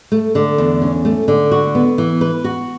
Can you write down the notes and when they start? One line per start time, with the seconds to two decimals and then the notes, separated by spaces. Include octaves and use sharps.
0.12 A3
0.35 D3
0.58 E2
0.82 C#4
1.05 A3
1.28 D3
1.51 F#4
1.75 B3
1.98 E3
2.21 B4
2.44 F#4